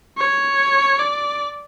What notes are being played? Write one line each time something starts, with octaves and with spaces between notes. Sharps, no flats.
C#5
D5